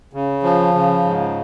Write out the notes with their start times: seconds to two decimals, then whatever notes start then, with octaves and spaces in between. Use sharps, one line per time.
0.13 C#3
0.43 F3
0.74 C#3
1.05 G#2